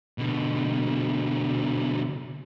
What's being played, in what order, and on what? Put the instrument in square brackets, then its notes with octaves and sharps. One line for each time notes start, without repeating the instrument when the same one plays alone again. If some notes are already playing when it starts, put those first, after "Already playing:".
[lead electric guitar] B2 D3